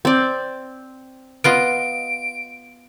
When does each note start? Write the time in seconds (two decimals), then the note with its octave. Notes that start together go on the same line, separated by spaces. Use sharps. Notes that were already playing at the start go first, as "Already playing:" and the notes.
0.05 C4 D5
1.44 B3 F4 D#5 D7